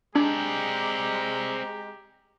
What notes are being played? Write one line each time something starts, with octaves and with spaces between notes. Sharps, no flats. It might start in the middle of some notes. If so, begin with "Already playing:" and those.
G#3 C4 D4 G4 D5 A#5